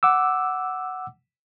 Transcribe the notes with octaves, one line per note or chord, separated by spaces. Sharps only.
F#5 D6 E6